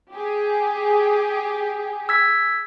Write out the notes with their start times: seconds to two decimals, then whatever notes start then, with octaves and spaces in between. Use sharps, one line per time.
0.13 G4 G#4
2.09 E6 G#6 B6